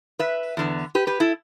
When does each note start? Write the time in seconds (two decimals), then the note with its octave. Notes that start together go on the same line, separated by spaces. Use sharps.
0.19 B4 E5
0.57 E2 D3 B3
0.95 G4 B4
1.07 G4 B4
1.20 E4 A4